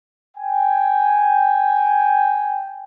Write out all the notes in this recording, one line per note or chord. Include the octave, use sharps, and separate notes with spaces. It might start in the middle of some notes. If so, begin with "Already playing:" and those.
G5 G#5